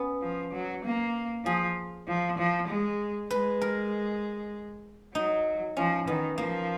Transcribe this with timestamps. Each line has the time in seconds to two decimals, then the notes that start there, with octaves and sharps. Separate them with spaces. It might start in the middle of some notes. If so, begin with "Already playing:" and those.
Already playing: B3 C#4
0.22 F3
0.53 F#3
0.84 A#3
1.45 F3 G#4
2.08 F3
2.38 F3
2.68 G#3
3.30 G#3 B4
3.61 A#4
5.14 F#3 D#4
5.77 F3 C#4
6.07 D#3 B3
6.38 F3 A#3